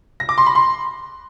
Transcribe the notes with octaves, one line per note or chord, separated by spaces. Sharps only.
A#6
D6
C6
B5
C6